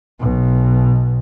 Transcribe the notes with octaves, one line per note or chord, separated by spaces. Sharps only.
B1 B2